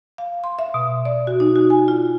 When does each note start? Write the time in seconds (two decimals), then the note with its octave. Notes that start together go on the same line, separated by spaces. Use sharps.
0.18 F5
0.44 C6
0.59 E5
0.74 B2
1.05 D5
1.27 F#4
1.40 D#4
1.56 F#4
1.70 G#5
1.88 F4